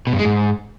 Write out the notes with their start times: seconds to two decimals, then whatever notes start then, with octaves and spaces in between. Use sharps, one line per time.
0.07 B2
0.13 G2
0.19 G#3
0.25 G#2